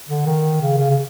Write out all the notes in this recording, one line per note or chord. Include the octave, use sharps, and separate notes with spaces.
D3
D#3
C#3
C#3
C#3